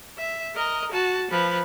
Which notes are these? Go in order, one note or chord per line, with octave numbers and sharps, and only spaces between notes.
E5
A#4 D#5
F#4 A5
F3 B4